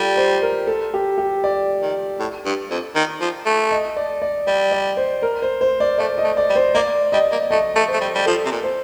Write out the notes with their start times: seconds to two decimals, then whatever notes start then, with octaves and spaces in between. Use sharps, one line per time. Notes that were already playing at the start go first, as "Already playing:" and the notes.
Already playing: G3 F4 G4 A4 D5
0.17 C5
0.42 A#4
0.67 A4
0.94 G4
1.18 G4
1.44 D5
1.82 D#3
2.19 A2
2.45 G2
2.70 F2
2.95 D#3
3.21 F3
3.46 A3
3.71 D#5
3.96 D5
4.22 D5
4.47 G3 D5
4.72 D5
4.97 C5
5.22 A#4
5.42 C5
5.61 C5
5.80 D5
5.98 A3 D5
6.18 D#5
6.24 A3
6.37 D5
6.49 G3
6.56 C5
6.74 A#3 D5
7.12 G3 D#5
7.31 A#3
7.50 A3 D#5
7.75 A3
7.88 A3 C5
8.00 G3
8.15 G3
8.26 F3 A4
8.45 C3
8.51 A#2
8.64 C5